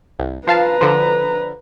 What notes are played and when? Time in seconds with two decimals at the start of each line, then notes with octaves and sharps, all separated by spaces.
0.19 C2
0.47 F3 B4 F5 A5 A#5
0.81 D3 F3